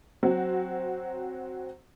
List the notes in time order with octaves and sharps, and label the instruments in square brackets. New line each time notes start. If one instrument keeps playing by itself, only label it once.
[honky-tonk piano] F#3 C4 F#4